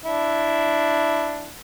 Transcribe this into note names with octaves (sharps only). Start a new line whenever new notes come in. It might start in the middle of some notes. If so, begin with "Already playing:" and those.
D4 E4